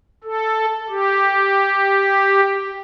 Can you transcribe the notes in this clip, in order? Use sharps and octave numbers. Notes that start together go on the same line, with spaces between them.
A4
G4